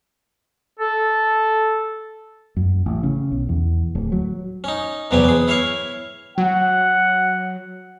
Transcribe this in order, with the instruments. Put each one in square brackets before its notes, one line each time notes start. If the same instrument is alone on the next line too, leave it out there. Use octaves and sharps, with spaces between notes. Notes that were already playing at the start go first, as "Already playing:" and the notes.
[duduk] A4
[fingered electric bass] F#2
A1
C#3
B1
E2
D1
F#3
[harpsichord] C#4 D#4
E2 C3 F#3 B3 G4 G#5
B3 G#4
E4 C#5 E5 F5 C#6
[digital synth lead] F#3 [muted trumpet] F#5